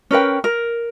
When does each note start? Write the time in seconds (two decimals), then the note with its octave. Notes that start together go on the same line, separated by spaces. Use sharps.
0.11 C#4 A#4 B4 G5
0.44 A#4